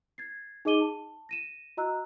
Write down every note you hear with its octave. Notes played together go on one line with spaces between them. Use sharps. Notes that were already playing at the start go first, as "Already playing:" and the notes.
G#6 A6 C7
D#4 G#4 D#5 D6 D#7 G7
A5
A#6 D#7 E7
F#4 D#5 A#5 E6 F#6